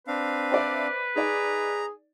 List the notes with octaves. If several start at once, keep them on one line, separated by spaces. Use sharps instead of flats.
C4 D4 B4 F5
C5 D5 E5
D#4 G#4 D5 A#5